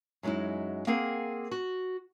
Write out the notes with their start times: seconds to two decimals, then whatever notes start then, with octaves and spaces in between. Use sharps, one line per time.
0.23 F#2 F#3 G#3 D#4 E4
0.87 A#3 C4 G#4 A#4 F5 F#5
1.51 F#4